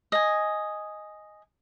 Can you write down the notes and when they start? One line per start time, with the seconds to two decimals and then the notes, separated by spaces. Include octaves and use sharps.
0.12 D#5 G#5